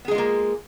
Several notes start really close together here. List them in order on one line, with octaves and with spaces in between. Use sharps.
B3 G#4 G#3 F4 A#3